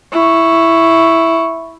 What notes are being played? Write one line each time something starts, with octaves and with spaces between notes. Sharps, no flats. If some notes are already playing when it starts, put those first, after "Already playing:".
E4 C#6